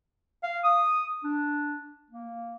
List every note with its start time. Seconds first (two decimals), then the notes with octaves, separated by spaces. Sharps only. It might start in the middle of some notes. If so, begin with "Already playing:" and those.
0.43 F5
0.64 D#6
1.24 D4
2.10 A#3